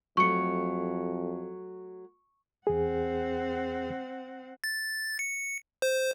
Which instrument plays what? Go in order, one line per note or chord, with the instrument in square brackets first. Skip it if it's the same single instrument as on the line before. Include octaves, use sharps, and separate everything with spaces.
[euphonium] F2 [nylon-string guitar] F#3 A3 [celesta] C#6 C#7
[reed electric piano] E2 G#4 [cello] C4 F#5
[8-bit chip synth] A6
C#7
C5